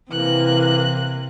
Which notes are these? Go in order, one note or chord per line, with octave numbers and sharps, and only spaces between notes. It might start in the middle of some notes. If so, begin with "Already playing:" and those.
C3 E3 A#3 F#6